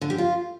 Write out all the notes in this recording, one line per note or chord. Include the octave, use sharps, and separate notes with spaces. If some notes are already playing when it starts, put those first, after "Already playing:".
D3
G4
F4